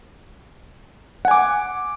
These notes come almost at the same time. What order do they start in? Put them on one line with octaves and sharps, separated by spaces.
F#5 G#5 D6